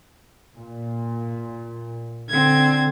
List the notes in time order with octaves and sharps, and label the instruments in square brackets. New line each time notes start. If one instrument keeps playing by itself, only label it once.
[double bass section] A#2
[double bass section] D3 [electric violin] C4 G#6